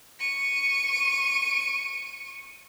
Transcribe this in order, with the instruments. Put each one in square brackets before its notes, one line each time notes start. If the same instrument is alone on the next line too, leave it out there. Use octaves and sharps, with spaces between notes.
[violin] C#6 D#7